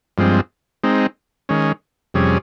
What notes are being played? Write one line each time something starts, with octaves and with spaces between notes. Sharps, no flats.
G2 F3 G#3 C4
G#3 C4 D#4
D#3 G#3 C#4
F2 C3 G3 C#4 G#4